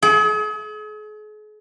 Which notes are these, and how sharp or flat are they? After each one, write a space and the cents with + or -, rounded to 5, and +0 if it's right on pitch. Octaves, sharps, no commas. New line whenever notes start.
G#4 +40